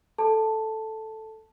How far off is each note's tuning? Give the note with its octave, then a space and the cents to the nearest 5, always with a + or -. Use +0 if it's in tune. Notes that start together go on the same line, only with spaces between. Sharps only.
A4 +0 A5 +0